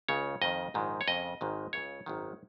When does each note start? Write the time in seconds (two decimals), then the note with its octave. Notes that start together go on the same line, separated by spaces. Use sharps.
0.08 C#2 C#3 C#5
0.42 F2 D#3 D#5
0.74 A#1 G#2 D#3
1.01 C#5
1.08 F2 C#3 D#5
1.41 G#1 G#2 D#3
1.73 C#2 C#3 C#5
2.06 G#1 F#2 D#3